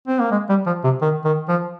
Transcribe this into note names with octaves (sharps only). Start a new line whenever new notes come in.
C4
A#3
G#3
G3
F3
C3
D#3
D#3
F3